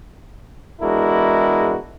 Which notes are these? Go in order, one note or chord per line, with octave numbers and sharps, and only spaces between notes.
E2 G#3 D4 E4 F#4 A#4